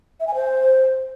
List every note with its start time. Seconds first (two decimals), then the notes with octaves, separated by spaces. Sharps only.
0.20 E5
0.27 G#5
0.35 C5